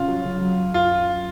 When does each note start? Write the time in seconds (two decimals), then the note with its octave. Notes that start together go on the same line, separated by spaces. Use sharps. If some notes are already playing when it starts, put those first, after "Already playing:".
Already playing: C2 C#3 C#4 F4
0.08 F#3
0.25 C#3
0.41 F#3
0.57 F#3
0.74 F#2 F4
0.92 F#2